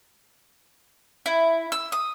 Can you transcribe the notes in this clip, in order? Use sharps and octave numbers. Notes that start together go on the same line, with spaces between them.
E4
E6
D#6